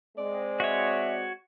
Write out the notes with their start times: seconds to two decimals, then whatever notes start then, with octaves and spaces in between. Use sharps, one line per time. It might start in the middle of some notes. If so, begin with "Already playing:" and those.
0.18 G#3 C4 D5
0.60 F#4 C#5 E5